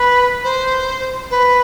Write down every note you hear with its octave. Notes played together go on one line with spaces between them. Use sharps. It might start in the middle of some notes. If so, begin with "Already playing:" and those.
Already playing: B4
C5
B4